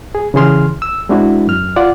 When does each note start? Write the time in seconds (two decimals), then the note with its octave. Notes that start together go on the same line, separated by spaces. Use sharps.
0.15 G#4
0.34 C#3 E3 G#4 C6 F6
0.82 E6
1.09 G#3 C4 D4 E4 F#4
1.47 F#2 F6
1.76 F4 D5 F#5